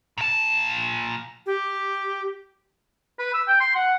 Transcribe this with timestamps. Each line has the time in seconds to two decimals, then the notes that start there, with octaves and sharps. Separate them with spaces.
0.18 A#2 A5
1.46 G4
3.19 B4
3.34 E6
3.48 G5
3.60 C6
3.75 F#5